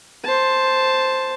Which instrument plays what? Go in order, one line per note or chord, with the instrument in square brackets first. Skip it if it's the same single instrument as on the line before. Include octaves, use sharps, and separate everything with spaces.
[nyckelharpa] C5 A5